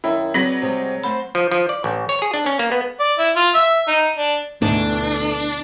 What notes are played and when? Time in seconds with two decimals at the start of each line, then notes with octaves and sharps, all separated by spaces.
0.04 F#2 D#3 E4 G5
0.34 F#3 C4 G#4 B4 D5 A#6 F#7
0.62 C3 G3 G#3
1.03 A3 C5 F#5 B5
1.35 F3
1.52 F3
1.69 D5
1.84 A1
2.09 C#5
2.22 G#4
2.34 D4
2.46 C#4
2.59 A#3
2.72 B3
3.00 D5
3.19 E4
3.36 F4
3.55 E5
3.88 D#4
4.18 D4
4.62 D2 G#2 B2 E3 A3 D4